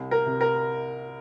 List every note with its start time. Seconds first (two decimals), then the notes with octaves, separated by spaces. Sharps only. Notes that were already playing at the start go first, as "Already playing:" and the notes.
Already playing: C2
0.11 A#4
0.26 C3
0.41 A#4